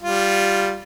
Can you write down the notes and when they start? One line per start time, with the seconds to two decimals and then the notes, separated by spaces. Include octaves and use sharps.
0.02 G3 F4